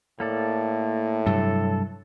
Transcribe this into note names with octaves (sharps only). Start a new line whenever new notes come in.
A2 A#3 A4 D5
G2 C3 F#3 A4